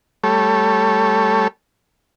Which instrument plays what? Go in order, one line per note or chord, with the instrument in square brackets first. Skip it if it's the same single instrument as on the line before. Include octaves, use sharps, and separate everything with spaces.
[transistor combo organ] G3 A3 A4 C#5